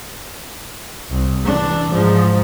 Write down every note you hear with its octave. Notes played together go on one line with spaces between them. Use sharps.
C2
E3 D4
G#2 F3